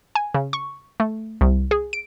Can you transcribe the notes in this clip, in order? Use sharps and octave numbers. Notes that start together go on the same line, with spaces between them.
G#5
C#3
C#6
A3
C2
G#4
D7